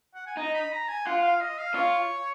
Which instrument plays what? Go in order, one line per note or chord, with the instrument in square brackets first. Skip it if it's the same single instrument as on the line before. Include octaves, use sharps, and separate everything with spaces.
[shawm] F#5
G#5
[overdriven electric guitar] D#4 [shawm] A#5
[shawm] B5
A#5
G#5
[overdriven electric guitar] F4 [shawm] F#5
[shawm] F5
D#5
F5
[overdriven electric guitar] F4 [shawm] C#5